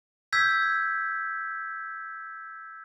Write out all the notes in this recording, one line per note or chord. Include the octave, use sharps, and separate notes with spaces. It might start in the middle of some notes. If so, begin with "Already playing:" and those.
E6 G6 G#6 B6